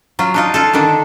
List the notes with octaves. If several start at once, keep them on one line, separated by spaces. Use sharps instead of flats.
F#3 F4
D4 D#4 F4
F4 A4
D3 D#3 D4